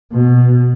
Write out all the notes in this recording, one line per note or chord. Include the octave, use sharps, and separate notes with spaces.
B2